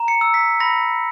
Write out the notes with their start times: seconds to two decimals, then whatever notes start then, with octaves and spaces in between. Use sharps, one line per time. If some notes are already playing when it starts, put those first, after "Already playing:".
Already playing: A#5
0.08 C#7
0.21 E6
0.34 B6
0.60 B5 A#6